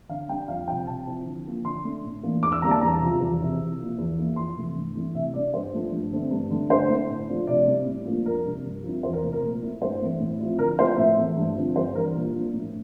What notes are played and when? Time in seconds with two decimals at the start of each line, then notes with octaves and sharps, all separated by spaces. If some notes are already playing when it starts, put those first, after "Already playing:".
0.09 D3 F5
0.29 G3 D4 G5
0.48 F2 F5
0.68 C3 F3 C4 G5
0.87 C3 A5
1.07 F3 C4 E4
1.26 D3
1.46 F3 A#3
1.65 D3 C6
1.84 A3 D4
2.04 A2
2.23 E3 A#3 D4
2.43 E2 D6
2.52 E6
2.62 D3 G3 A#3 E4 A#5
2.71 A5
2.81 E2 A#5
3.00 C3 F3
3.21 E2
3.40 C3 E3
3.59 C3
3.79 F3 A#3 E4
3.98 E2
4.18 E3 A#3 E4
4.36 F2 C6
4.57 C3 E3 A3
4.76 G2
4.95 E3 A3 E4
5.15 C3 E5
5.34 G3 D4 D5
5.54 G2 C5
5.73 F3 A3 D4
5.92 G2
6.12 D3 A3 C4
6.31 G2
6.50 D3 A3
6.69 D3 C5
6.89 A3 E4
7.09 A2
7.28 F3 A3 D4
7.47 C3 D5
7.67 G3 C4 E4
7.86 A2
8.06 F3 A#3 D4
8.25 F2 A#4
8.45 C3 G3 D4
8.64 G2
8.83 F3 C4 E4
9.03 E2 C5
9.13 A#4
9.23 C3 F3 A3 C4
9.32 A#4
9.42 A#2
9.62 A3 E4
9.81 G2 C5
10.01 E3 A3 E4
10.20 A2
10.39 F3 C4 E4
10.58 D3 A#4
10.78 F3 A3 E4 C5
10.97 A2 E5
11.17 E3 A3
11.37 G2
11.56 D3 F3 C4
11.75 G2 C5
11.95 E3 G3 D4 A#4
12.14 A#2
12.33 F3 A#3 D4
12.54 A2